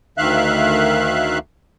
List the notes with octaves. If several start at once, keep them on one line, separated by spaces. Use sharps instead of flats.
D2 D#3 E5 F5 F#6